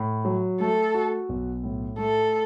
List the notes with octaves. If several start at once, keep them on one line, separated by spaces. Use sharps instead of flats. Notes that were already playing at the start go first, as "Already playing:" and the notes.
Already playing: A2
F#3
A3 A4
F#4
B1
A2
A3 A4